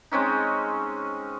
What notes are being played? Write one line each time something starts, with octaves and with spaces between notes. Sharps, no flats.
G#3 C4 C#4 D#4